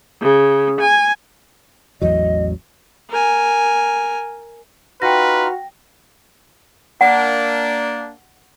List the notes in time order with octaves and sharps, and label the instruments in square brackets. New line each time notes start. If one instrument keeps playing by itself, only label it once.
[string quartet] C#3
G#5
[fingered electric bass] A1 E2 F#3 [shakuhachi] D#5
[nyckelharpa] A#4 G#5
[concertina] D#4 F4 F6 [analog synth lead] F#4 [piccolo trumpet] B4 [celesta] G5 A#6
[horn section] A#3 D4 [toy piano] F#5